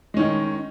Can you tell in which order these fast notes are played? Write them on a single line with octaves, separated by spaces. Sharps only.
G#3 C#4 D#3 D#4